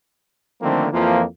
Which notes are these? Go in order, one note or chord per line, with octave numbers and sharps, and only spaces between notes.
D3 D#3 F3 A3 A#3 C4
F2 E3 F3 A#3